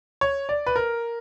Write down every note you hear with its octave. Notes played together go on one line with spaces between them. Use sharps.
C#5
D5
B4
A#4